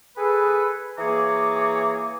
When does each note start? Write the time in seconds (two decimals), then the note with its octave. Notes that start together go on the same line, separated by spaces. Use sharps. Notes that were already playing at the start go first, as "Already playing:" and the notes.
0.17 G#4 A4 B4
0.99 E3 A#3 G#4 C#5 A#5 D6